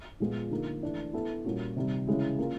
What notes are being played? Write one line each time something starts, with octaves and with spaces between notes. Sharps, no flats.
A#2 F3 G#3 B3
D3 F3 A#3 D#4
E3 A3 D4
B3 E4 A4
A#2 G3 A#3 C#4 F#4
C3 D#3 G3
C#3 E3 G#3 C#4 E4
A#3 C#4 F4 A#4